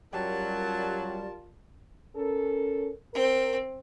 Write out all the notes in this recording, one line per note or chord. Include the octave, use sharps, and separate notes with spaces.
F#2 F#3 G3 F4 A#4 A5
C#4 A4 A#4
C4 A#4